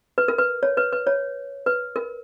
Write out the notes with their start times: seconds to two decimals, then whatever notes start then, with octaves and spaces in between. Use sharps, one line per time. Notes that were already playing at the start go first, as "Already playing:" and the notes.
0.18 B4
0.28 A#4
0.38 B4
0.63 C#5
0.77 B4
0.92 B4
1.07 C#5
1.66 B4
1.96 A#4